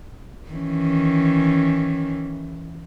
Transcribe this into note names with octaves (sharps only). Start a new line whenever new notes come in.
D#3 E3 C#4